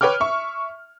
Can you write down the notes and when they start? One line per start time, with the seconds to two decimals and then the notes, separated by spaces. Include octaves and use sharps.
0.01 B4 C#5 G5 D6 F6
0.20 E5 C#6